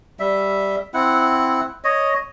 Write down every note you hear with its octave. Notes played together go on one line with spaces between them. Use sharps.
G3 E5
C4 E4 F#5
C#5 D#5